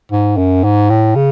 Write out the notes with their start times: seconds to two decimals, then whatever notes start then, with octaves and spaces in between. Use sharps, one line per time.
0.12 G#2
0.37 F#2
0.64 G#2
0.90 A2
1.16 C#3